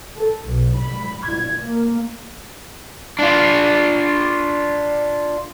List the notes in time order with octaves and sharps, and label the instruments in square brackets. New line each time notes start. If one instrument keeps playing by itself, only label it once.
[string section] A4
B1
B5
G#6
A#3
[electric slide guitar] D4 F4